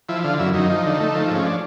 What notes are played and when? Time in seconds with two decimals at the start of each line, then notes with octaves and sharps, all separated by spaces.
0.09 F3 E4
0.24 D3 F4
0.39 F#2 E4
0.54 F#2 D#4
0.70 F3
0.85 D3
1.00 A3
1.15 F3
1.30 G#2 C#4
1.46 D4